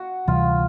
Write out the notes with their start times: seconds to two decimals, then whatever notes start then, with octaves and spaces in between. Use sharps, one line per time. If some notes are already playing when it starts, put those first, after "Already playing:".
Already playing: F#4
0.27 D2 C3 E3 G3 F4